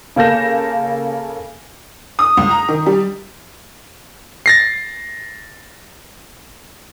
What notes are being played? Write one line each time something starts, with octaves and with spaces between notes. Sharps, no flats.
C#3 A#3 A4 G6 A#6 E7
D#6
C#2
A#5
D#3
G3
A6 A#6 C7